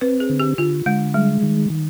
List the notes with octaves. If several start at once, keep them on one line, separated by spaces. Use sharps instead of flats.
C4 B4
G#4
D3
G4
D3 F4
D3 G#3
G3 G#3
D#3
D#3